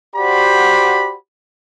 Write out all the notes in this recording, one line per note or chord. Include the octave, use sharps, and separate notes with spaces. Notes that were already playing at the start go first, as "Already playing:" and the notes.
F#4 G4 C5 D5 F#5 B5